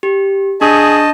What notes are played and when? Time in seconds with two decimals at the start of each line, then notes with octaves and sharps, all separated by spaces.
0.03 G4
0.61 D4 G#4 D#5 A5 C#6 G6